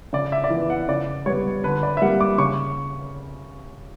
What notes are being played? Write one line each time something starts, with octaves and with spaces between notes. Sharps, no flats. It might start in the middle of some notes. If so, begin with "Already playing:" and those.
C#3 D5
E5
D5
E3 B3 E5
F#5
C#3 D5
G3 B3 C#5
D3 B4
D5
E5
G3 A#3 F#5
D6
C#3 C#6